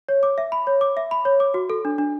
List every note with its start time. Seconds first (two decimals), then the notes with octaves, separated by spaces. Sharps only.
0.09 C#5
0.23 D6
0.38 E5
0.52 B5
0.67 C#5
0.81 D6
0.97 E5
1.11 B5
1.25 C#5
1.40 D6
1.54 F#4
1.70 A4
1.85 D4
1.98 D4